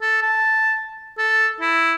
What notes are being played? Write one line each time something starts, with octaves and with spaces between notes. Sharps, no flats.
A4
A5
A4
E4